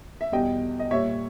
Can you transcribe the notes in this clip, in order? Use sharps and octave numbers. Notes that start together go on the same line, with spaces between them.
E5
E2 B2 G3 D#5 G5
D#5
A#2 G3 C#5 E5